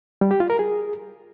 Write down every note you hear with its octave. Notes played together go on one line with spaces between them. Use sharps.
G3
G4
F4
A#4
G#4